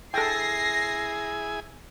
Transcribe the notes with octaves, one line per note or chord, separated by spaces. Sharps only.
E4 G#4 A4 G5 G#5 A#6 C7